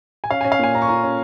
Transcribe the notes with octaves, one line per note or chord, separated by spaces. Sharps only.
G#5
C#4 F5
C#4 G#5
F5
A#2 G#5
C#4 A#5
C#6
F4 A#5
C#4